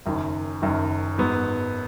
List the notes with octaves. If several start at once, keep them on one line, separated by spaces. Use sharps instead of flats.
F#1 F#2 D#3
F#1 F#2 D#3
G#2 F#3 B3